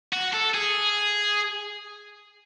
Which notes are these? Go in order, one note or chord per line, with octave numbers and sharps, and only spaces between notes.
F#4
A4
G#4